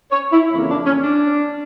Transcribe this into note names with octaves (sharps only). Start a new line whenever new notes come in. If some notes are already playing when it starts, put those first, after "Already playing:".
C#5
E4
F2 C#3 E3 A#3 E4
D4
C#4
D4